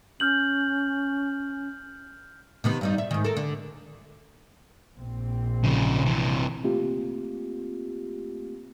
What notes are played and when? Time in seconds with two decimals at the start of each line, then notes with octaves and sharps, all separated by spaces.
0.20 C#4 F6 G6 F#7
2.64 C3 D#3 B3
2.81 G2 G3 D#4
2.98 E5
3.11 G#2 D#3
3.24 A4 A#4
3.37 D3
4.98 A#1 C4
5.64 C#3 F3
6.05 C3 E3
6.64 A3 A#3 C4 F4 G4